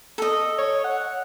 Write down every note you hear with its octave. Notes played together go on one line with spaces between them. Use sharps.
A4 D#5
C#5
F#5